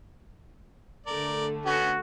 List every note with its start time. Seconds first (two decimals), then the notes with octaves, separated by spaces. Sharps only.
1.06 D3 A3 A#4 D5
1.66 B3 C#4 F#4